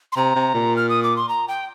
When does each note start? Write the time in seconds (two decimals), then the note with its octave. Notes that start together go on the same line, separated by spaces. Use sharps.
0.12 C6
0.16 C3 A#5
0.35 C3
0.54 A#2
0.76 F6
0.89 D#6
1.03 D6
1.16 C6
1.29 A#5
1.48 G5